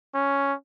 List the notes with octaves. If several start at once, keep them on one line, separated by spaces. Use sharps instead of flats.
C#4